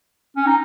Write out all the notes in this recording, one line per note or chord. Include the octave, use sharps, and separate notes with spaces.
C#4
D#4